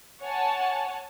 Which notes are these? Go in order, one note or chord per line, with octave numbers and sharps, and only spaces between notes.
C#5 F#5 G#5 A5